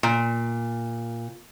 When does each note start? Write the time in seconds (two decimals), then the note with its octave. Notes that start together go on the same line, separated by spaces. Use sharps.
0.03 A#2